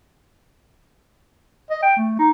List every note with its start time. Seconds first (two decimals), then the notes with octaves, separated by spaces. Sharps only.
1.71 D#5
1.83 G5
1.97 A3
2.19 D#4